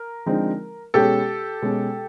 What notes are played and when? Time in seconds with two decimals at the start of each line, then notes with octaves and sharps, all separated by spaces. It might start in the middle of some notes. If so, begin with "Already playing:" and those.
Already playing: A#4
0.26 D3 F3 G#3 C4 D#4
0.94 B2 G#3 C#4 G4 A4
1.62 B2 G#3 C#4